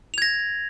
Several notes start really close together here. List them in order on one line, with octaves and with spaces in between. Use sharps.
F7 G#6 A#6